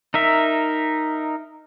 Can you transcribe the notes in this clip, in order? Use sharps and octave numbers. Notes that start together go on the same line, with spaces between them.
D#4 A#4 E5